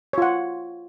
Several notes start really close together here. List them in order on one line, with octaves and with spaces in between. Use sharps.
C#5 F4 F#5